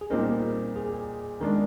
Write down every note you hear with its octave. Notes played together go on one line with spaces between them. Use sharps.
G#4
A#2 G3 C4 D#4 A#4
G#4
D#3 G#3 D4 A#4